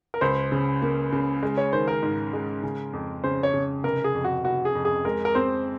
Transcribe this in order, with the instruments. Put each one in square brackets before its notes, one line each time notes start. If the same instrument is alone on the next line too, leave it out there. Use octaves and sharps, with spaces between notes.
[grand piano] A#4
[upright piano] C#2 [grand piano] C5
[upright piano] C#3
A#3
C#3
G#3
[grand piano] C#5
[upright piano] D#3 [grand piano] C5
[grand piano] A#4
[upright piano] G#2
G#3
C#3
F2
[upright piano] C#3 [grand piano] C5
[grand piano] C#5
[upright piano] C#3
[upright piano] F1 [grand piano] A#4
[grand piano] G#4
[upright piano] F2
[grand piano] F#4
[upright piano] F1 [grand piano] F#4
[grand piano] G#4
[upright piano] F2
[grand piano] G#4
[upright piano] G#3 [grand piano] A#4
[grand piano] A#4
[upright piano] C4 [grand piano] C5